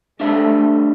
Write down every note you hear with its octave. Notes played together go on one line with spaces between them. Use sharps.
G3 A3 D4 C5 E5